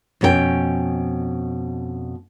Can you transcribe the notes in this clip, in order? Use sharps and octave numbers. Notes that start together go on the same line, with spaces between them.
F2 B2 C#4 A4 G5